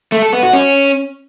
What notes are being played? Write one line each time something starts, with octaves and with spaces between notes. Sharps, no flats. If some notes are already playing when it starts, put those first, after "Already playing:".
A3
A4
B3
F#4
C#4